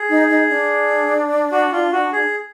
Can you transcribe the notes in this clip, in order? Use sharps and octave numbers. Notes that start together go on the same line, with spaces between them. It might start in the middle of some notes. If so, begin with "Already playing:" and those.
Already playing: G#4
D#4
D#4
D4
F#4
F4
F#4
G#4